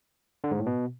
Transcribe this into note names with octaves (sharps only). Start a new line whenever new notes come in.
D3
G#2
A2
B2